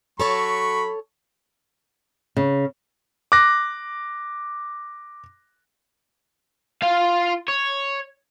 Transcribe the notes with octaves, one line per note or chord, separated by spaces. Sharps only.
F#3 A4 C#5 A5 B5 C#6
C#3
D6 F#6 A#6
F4 F5
C#5